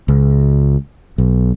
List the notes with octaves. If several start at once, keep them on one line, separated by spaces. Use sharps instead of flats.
C#2
B1